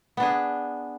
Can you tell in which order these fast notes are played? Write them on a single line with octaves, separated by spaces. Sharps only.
B3 D4 G#4